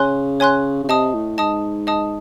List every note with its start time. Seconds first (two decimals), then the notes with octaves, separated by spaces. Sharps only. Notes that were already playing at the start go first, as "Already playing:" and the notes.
Already playing: C#3 C#5 G#5 C6 F#6
0.40 C#5 G#5 C6 F#6
0.84 C#3
0.88 C3 D#5 A5 D#6
1.14 A2
1.38 G#2 D#5 A5 D#6
1.87 D#5 A5 D#6